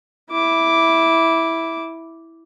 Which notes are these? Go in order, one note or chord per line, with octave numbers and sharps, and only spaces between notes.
E4 D6